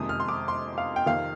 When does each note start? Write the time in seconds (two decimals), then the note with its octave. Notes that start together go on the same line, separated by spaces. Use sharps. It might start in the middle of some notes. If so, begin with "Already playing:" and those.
Already playing: F2 C3 D#3 G#3 D#6
0.09 F6
0.20 C6
0.29 D6
0.48 C6
0.78 F5
0.96 G5
1.06 F2 C3 D#3 F5